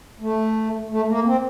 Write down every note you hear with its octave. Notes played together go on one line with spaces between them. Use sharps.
A3
A3
A#3
C4